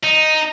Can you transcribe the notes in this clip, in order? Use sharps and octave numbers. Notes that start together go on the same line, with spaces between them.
D#4